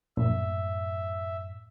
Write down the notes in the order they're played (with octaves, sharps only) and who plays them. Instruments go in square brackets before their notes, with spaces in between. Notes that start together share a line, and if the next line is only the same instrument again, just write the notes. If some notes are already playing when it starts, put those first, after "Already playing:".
[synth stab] A#1 [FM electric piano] F#2 A2 [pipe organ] E5